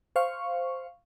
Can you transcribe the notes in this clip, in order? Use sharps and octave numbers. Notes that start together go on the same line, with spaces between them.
C5 F5 C#6